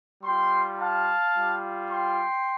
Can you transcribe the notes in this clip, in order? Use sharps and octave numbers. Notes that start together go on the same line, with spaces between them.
G3 F4 G5 C6
F5 A5
G3 F4
G5 C6